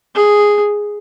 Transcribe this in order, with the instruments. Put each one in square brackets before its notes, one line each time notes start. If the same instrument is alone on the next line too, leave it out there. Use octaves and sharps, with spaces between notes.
[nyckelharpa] G#4